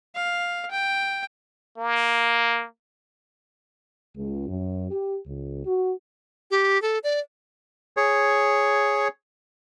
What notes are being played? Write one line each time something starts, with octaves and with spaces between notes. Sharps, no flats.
F5
G5
A#3
C#2
F#2
G4
C#2
F#4
G4
A4
D5
G#4 C#5